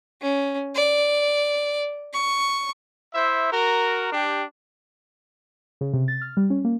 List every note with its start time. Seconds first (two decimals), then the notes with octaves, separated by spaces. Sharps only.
0.22 C#4
0.75 D5
2.14 C#6
3.13 E4 C5 E5
3.51 F#4 A#4
4.11 D4 G4
5.81 C#3
5.93 C3
6.08 A6
6.21 F6
6.37 G3
6.50 C#4
6.65 A#3